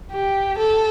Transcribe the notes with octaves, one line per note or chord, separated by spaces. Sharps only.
G4
A4